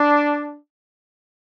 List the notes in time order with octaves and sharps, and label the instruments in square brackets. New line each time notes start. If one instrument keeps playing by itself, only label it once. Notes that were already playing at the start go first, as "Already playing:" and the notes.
Already playing: [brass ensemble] D4